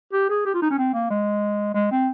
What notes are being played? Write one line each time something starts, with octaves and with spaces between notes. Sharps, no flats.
G4
G#4
G4
F4
D#4
C#4
C4
A#3
G#3
G#3
C4